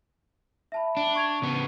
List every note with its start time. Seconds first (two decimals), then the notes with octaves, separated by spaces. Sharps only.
0.72 E5 A5 B5
0.97 D4
1.15 C#6 G#6 F7
1.42 C#3 B3